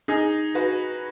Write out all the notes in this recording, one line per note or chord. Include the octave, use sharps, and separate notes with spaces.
D#4 G#4
F#4 B4